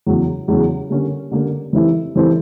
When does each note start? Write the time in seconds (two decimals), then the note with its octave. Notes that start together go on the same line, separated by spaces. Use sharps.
0.07 E2 C#3 F#3
0.48 E2 C#3 F#3
0.90 D3 G3 A#3 C#4
1.31 D3 G3 A#3 C#4
1.73 E3 G3 C4 E4 A4
2.16 E3 G3 C4 E4 A4